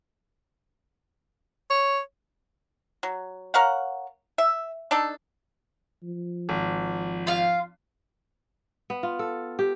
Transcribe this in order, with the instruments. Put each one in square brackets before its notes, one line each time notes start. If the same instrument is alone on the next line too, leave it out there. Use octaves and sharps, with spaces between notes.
[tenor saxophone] C#5
[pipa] F#3
A#4 C#5 F5 F#5
E5
D4 D#4 A4
[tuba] F3
[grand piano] G#1
[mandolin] F4 F5
[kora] B3
F4
A4
G4